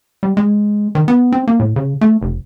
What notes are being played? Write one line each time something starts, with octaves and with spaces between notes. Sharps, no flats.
G3
G#3
D#3
B3
C4
A#3
A2
C#3
A3
F1